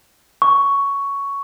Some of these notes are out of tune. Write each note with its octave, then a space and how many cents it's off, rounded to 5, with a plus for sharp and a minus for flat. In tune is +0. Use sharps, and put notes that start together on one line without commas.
C#6 +10